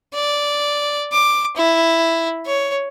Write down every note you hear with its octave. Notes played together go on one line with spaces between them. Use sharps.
D5
D6
E4
C#5